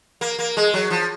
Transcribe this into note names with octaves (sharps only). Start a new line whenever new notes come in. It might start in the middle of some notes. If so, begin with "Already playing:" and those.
A#3
A#3
G#3
F#3
F3